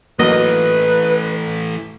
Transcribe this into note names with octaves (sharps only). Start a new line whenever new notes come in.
E3 F#3 A3 A#3 A#4 B4 D#5